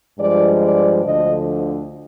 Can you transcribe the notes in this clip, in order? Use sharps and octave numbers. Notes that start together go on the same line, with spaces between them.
G2 F3 G#3 D5
D5
D2 D3 F3 D#5